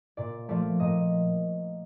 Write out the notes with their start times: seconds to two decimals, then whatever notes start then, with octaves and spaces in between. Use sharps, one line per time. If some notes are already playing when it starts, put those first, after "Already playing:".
0.17 A#2 D5
0.49 F3 A3 D5
0.80 A#2 D#5